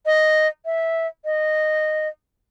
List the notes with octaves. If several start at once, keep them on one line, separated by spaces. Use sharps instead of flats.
D#5
E5
D#5